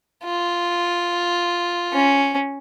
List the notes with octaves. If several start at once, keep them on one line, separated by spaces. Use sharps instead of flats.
F4
C#4